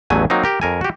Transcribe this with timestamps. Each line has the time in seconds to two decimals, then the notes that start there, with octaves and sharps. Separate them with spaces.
0.10 A1 E2 F#3 A3 G#5
0.30 F#3 A#3 C4 D#4
0.44 G4 A#4
0.61 F2 A#4 G#5
0.81 F#4 G4